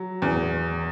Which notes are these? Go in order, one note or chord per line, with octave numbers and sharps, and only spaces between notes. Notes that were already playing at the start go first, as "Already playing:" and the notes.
Already playing: F#3
E2